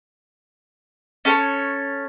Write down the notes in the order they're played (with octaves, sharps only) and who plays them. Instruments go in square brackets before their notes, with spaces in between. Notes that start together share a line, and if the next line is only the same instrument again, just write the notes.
[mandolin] C#4 A4 C5 C#5